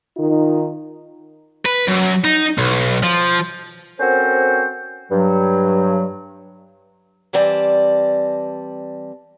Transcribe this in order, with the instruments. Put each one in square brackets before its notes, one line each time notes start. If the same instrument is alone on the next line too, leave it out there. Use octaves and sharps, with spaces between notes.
[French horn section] D#3 D#4 F4
[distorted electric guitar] B4
F#2
D#4
B1
F3
[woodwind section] C4 C#4 F#4 A4 A#4 C5
G2 F#3
[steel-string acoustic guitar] E3 G3 C4 D5 A5